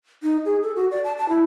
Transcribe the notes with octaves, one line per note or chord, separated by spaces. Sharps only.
D#4
G#4
A4
F#4
D5
A5
A5
E4